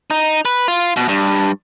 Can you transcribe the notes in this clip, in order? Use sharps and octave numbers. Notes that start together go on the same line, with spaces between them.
D#4
B4
F4
B2
G2